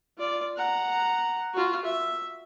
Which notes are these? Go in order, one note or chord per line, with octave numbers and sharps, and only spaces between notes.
F4 D5
F#5 A#5
F4 F#4
E5